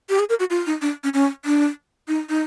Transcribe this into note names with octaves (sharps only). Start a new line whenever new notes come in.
G4
G#4
A#4
F#4
F4
D#4
D4
C#4
C#4
D4
D#4
D#4